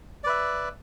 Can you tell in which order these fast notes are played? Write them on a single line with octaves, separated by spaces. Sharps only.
D5 B4 E5